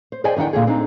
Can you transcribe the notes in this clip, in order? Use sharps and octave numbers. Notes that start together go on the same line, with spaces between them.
C5
G#4 C5 D5 D#5 G5 G#5
E2 D#3 D4 F#5 G5
A#2 D3 G#4
C4 D4 D#4